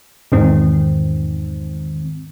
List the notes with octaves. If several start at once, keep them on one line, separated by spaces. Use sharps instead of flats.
E2 G#2 D#3 C4